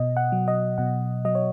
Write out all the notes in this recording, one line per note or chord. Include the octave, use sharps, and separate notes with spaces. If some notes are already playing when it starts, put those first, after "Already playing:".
Already playing: B2 D#5
F#5
F#3
D#5
B2 F#5
F#3 D#5
C#5